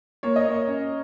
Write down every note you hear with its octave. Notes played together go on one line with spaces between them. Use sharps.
A#3 C#5
D#5
A#4 C#5
C#4